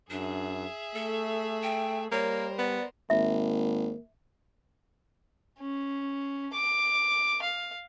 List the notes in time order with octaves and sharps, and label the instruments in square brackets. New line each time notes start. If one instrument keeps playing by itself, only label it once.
[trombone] F#2 [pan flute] D4 [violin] G#4 E5
[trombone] A3 [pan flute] A4
[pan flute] G5
[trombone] G3 [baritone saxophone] A#3 [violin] A#4 C5 [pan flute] C#5
[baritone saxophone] B3 [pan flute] D5
[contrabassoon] G#1 [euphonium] A#3 [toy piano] E5
[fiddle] C#4
D6
F5